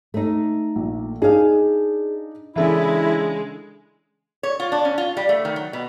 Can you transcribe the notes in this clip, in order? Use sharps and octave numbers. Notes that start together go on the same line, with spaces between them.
A3 D#4
A#1
D4 D#4 G#4 F5
C#3 E3 G#3 D4 E4 A4 E5
C#5
F4
D4
C#4
F4
G3
A3
D#3
F#3
B2